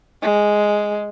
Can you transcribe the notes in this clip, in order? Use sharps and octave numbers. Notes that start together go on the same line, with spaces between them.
G#3